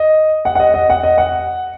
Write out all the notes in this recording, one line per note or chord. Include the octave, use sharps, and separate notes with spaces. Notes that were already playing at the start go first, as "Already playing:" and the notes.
Already playing: D#5
F#5
F#5
D#5
D#5
F#5
D#5
F#5